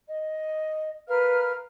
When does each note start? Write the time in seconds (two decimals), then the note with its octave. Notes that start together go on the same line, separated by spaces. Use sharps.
0.07 D#5
1.07 A#4 B4 F5 F6